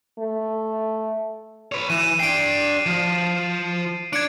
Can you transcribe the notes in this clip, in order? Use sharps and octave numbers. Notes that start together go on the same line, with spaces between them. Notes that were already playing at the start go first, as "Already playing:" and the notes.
A3
B4 C#5
E3 D#7 E7
D4 G5 C7 D7
F3
D4 G#6 C#7 D7